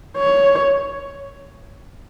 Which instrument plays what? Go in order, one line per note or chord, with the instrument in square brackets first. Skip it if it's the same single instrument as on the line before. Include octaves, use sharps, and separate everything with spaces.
[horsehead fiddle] C#5